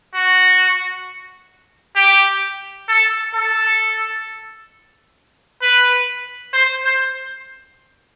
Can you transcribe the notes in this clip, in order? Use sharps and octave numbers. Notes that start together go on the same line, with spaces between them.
F#4
G4
A4
A4
B4
C5
C5